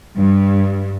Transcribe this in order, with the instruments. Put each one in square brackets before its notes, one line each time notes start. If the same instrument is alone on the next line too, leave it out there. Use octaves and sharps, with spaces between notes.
[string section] G2